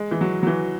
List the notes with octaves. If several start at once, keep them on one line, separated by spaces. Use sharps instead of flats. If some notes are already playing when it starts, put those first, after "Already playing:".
Already playing: G#3
E3
F#3
F#3
E3